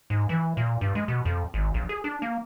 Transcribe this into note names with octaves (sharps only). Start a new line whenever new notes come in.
G#2
E3
A#2
G2
G#3
B2
F2
G#1
A#1
G#4
D4
A#3